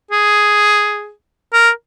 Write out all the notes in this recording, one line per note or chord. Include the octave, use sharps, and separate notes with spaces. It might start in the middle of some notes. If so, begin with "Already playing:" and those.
G#4
A#4